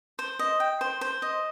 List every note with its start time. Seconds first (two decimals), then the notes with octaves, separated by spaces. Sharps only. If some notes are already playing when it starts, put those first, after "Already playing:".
0.19 C5
0.39 D#5
0.60 G5
0.81 C5
1.01 C5
1.22 D#5